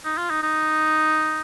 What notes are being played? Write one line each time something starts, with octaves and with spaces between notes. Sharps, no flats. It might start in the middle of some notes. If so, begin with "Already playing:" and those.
D#4
F4
D#4
D#4